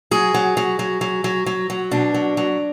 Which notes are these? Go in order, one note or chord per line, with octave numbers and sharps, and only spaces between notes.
F#3 G#4
F#3
F#3
F#3
F#3
F#3
F#3
F#3
B2 D4
F#3
F#3